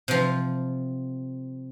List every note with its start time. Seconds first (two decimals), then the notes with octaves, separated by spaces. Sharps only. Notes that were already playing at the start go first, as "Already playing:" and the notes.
0.08 C3 F3